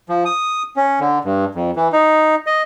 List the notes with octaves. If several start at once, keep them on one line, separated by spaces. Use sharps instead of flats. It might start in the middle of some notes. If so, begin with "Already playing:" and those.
F3
D#6
C#4
D3
G2
F2
E3
D#4
D#5